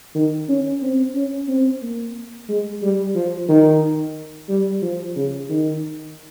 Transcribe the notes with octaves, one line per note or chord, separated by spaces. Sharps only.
D#3
C#4
C4
C#4
C4
A#3
G#3
G3
F3
D#3
G3
F3
C#3
D#3